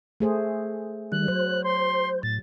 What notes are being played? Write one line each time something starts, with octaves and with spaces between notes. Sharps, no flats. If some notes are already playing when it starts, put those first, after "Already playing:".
A3 G#4 C5
D#3 G3 F#6
F#3 C5
C6
A2 A6